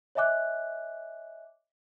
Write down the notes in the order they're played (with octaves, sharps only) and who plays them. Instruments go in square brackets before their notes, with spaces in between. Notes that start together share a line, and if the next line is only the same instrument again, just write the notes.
[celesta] C#5 D#5 E5 G#5 D6 F#6